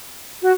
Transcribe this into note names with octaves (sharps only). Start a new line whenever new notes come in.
F#4